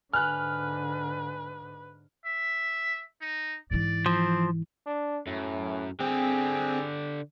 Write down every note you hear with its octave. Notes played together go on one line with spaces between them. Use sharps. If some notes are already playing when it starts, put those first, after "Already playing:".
G#2 D3 B4 G#5 F6 F#6
E5
D#4
G#2 E3 D5
F3 C4
D4
F#2 A2
D3 C4 G4 G#4